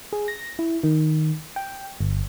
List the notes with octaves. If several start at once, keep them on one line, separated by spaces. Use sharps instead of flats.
G#4
A#6
E4
D#3
G5
G1